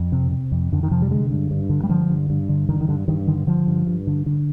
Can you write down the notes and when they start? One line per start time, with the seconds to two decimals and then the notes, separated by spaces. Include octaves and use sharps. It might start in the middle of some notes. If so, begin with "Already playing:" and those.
Already playing: F2
0.12 C3
0.31 C3
0.52 F2
0.72 F2 D3
0.83 D#3
0.91 C3 F3
1.02 G3
1.10 D3 G#3
1.30 G2
1.51 G2
1.70 D3
1.83 G3
1.89 D3 F3
2.10 G2
2.30 G2
2.49 D3
2.69 D3 D#3
2.81 D#3
2.88 G2 D3
3.08 G2 D#3
3.27 D3 D#3
3.47 D3 F3
3.67 G2
3.87 G2
4.07 D3
4.26 D3